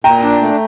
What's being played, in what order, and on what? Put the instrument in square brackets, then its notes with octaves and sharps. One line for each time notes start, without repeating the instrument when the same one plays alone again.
[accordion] A#2 [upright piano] G5 A#5
[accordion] D4
A3